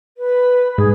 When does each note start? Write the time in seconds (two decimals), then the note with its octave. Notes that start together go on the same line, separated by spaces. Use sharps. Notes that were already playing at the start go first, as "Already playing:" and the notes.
0.17 B4
0.78 G#2 G#4